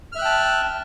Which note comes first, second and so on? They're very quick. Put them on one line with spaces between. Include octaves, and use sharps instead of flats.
F6 E5 F#6 G5 A5